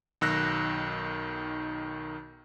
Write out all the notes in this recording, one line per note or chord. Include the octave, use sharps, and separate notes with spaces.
B1 D#3 E6 F#6 A#6